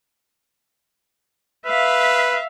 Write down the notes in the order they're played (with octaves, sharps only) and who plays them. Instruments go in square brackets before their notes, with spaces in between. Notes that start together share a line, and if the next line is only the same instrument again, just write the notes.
[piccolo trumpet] B4 [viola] E5 F5